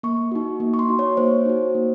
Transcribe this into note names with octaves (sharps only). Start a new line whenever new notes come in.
A#3 C#6
D#4 F#4
A#3
C#6
C6
D#4 F#4
C#5
A#3 C5
D#4 F#4
A#3